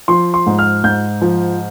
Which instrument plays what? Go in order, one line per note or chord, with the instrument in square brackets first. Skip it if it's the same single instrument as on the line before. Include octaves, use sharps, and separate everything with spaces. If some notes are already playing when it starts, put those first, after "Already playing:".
[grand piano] F3 C6
C6
G#2
F6
G#2 G6
F3